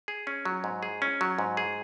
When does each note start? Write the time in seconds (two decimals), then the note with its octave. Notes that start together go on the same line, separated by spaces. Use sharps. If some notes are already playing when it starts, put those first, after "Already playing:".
0.08 G#4
0.27 C#4
0.45 F#3
0.64 G#2
0.83 G#4
1.02 C#4
1.21 F#3
1.39 G#2
1.57 G#4